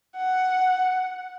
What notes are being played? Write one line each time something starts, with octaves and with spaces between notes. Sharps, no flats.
F#5